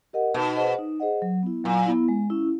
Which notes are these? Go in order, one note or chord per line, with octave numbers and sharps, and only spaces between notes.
G4 A#4 D#5 F#5
B2 D#4
G#4 C5 D#5 F#5
D#4
G#4 C5 D#5 F#5
F#3
B3 E4
A#2 F#3
B3 E4
G#3
C#4 E4